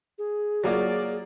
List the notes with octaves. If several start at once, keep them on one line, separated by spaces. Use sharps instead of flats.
G#4
F#3 A#3 F4 D5